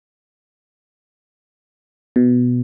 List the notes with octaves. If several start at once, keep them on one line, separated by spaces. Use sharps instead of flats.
B2